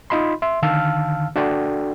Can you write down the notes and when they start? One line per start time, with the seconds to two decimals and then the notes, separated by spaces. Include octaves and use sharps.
0.10 D#4 F4 D#5 B5 C6
0.42 E5 C6
0.62 D3 D#3 F5 A5 E6 F6
1.36 D4 F#4 A4 D5 G5